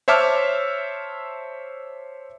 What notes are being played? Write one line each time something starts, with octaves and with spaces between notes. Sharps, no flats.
C5 C#5 E5 A5 D6 F6